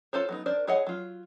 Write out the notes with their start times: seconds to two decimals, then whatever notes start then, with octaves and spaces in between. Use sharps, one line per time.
0.13 F4 A4 C5 C#5
0.29 F#3 B3 D#4
0.46 D4 A#4 C5 D5
0.67 E4 G#4 C#5 D#5 F#5
0.87 F#3 F4